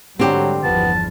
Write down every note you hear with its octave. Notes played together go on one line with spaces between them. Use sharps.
G#2 D3 F#3 G3 C4 G4
G1 E2 F3 B3 A5